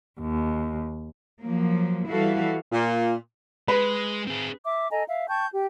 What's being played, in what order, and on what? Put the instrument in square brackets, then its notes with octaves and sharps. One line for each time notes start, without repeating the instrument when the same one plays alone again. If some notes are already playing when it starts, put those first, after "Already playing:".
[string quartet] D#2
[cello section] F3 F#3 A#3
E3 G3 E4 F#4 A4 F5
[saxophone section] A#2
[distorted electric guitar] G#3 [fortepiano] B4
[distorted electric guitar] C4 G#4
[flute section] E5 D6
A4 D#5 G#5 A#5
E5 F5
G5 A5 C#6 G6
G4